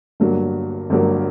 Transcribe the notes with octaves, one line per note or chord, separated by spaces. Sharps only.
G1 G2 F#3 A#3
G1 G2 F#3 A#3